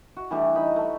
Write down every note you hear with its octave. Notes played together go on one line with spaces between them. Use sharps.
F#4
E3 G3 A3 D4
D#4 B5
A3 A5